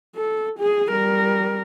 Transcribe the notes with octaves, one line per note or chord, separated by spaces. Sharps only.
A4
G#4
G3 A#4